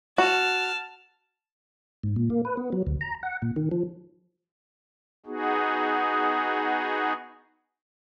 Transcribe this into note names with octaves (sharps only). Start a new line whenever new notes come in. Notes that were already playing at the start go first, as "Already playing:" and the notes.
F#4 A5 F6
G#2
A#2
A#3
B4
B3
F#3
D2
A#5
F#5
A#2
D#3
F3
B3 D#4 F#4 G#4